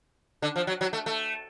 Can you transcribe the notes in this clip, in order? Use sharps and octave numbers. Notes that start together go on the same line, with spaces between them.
D3
F3
F#3
F#3
A3
A3